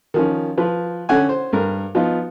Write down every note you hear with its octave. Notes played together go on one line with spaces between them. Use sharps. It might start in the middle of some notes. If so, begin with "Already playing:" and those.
D#3 F3 C#4
F3 B4
D3 C#4 F#5 G#5
C5
G2 A#4
F3 B3 D#4 F4